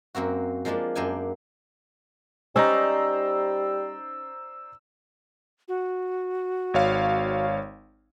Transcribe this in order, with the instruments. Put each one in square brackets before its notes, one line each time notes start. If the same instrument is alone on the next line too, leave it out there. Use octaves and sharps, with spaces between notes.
[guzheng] F#2 A#3 C4 F#4
F3 G#3 A#3 D4 F4
F#2 A#3 D4 G5 G#5
[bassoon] G3 [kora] C#4 D#4 [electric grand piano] C5 D5 A#5 [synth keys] E6
[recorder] F#4
[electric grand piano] G#1 C#5 F5